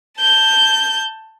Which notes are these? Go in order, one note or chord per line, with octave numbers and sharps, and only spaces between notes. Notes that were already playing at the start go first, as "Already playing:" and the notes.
A5 G6